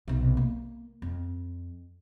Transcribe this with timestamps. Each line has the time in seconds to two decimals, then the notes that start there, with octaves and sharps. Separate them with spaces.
0.08 B1 C3
0.37 A#3
1.02 F2